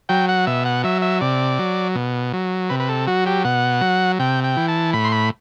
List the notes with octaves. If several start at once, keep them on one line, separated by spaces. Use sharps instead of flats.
F#3 G5
F#5
B2 E5
F#5
F#3 E5
E5
C3 D5
F#3
B2
F#3
C3 B4
B4
A4
F#3 F#4
G4
B2 F#5
F#3
C3 G5
G5
E3
A5
A2 B5
C6
B5